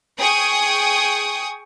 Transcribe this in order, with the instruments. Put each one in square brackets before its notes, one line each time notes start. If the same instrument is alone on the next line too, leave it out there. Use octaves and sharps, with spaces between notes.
[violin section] G#4 G5 C#6 D#6